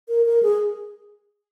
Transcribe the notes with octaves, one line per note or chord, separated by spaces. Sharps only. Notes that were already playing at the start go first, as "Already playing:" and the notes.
A#4
A#4
G#4